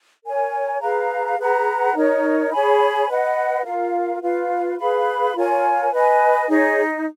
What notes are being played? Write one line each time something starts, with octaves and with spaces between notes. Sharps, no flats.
A#4 C#5 G#5
G#4 B4 F5 A#5
G#4 B4 F#5 A#5
D#4 A#4 C#5
G#4 C#5 G#5 B5
B4 D#5 F#5
F4 A#4 F5
F4 B4 F5
G#4 B4 F5 B5
F4 A#4 C#5 G#5
B4 D#5 G#5
D#4 G#4 C#5